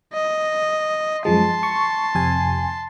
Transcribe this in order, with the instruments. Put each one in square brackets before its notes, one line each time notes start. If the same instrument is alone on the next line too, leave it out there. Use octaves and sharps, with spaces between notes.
[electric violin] D#5
[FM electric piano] F#2 F3 G#3 [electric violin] A5 C6
[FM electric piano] C#6
F2 C3 G#5